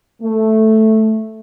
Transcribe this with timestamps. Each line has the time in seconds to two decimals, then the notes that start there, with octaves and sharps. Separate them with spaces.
0.22 A3